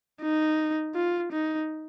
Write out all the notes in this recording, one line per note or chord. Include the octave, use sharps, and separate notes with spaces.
D#4
F4
D#4